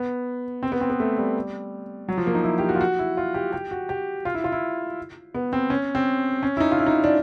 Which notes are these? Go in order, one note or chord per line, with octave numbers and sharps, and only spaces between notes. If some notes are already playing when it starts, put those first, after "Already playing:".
Already playing: B3
C4
B3
C4
B3
A3
G3
F#3
F3
A#3
D#4
E4
G4
F#4
F4
F#4
E4
F4
G4
G4
F#4
G4
F4
E4
F4
E4
B3
C4
C#4
C4
C#4
E4
D#4
F4
E4
D#4
E4
D4